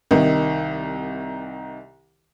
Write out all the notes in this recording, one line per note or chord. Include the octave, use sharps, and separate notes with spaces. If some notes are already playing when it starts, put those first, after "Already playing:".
C2 D#3